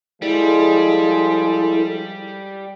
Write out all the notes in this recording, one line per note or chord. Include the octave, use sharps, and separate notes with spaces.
F3 G3 G#3 E4 A4